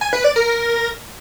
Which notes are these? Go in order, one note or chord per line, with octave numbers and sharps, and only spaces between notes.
G#5
B4
D5
A#4